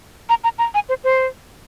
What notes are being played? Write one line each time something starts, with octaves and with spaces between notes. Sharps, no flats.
A#5
A#5
A#5
G#5
C5
C5